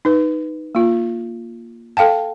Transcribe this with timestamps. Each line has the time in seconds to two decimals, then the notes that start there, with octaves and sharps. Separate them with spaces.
0.05 D#4 B4
0.75 A#3 F4
1.97 A4 F5 G5 A5